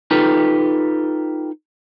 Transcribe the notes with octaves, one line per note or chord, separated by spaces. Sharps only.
D#4 F4 G4 A4 B4